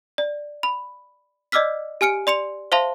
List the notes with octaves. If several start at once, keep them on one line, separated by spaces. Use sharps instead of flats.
D5
B5
D5 D#5 D6 E6 F6 B6
G4 G#5 F6 C#7 D7
D5 C6 C#7 F7
C5 E5 F5 A5 C6